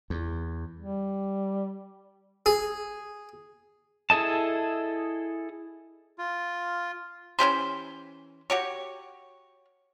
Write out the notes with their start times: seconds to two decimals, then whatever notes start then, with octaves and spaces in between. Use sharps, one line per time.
0.10 E2
0.78 G3
2.46 G#4
4.10 E4 G#4 A4 D#5 A5
6.18 F4
7.39 E3 C#4 G4 C5
8.50 F#4 G4 C#5